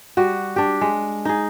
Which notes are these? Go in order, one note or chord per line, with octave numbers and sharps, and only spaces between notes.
G3 F#4
D4 G4
G#3
D#4 G#4